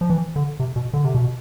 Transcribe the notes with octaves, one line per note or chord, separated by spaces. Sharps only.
F3
E3
D3
C3
B2
D3
C3
B2